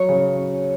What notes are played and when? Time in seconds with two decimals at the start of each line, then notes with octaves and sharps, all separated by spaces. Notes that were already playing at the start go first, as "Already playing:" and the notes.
Already playing: F#3 C#5
0.09 C#3